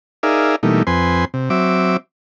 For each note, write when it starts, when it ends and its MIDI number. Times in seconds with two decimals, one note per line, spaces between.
0.23 0.56 63
0.23 0.56 68
0.23 0.56 70
0.23 0.56 74
0.23 0.56 76
0.23 0.56 77
0.63 0.83 47
0.63 0.83 52
0.63 0.83 55
0.63 0.83 57
0.63 0.83 58
0.63 0.83 63
0.87 1.25 41
0.87 1.25 60
0.87 1.25 71
0.87 1.25 80
0.87 1.25 84
1.34 1.49 48
1.50 1.97 54
1.50 1.97 60
1.50 1.97 76
1.50 1.97 86